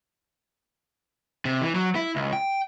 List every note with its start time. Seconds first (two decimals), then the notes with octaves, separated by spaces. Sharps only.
1.45 C3
1.62 E3
1.75 F#3
1.95 E4
2.16 C#2
2.33 G5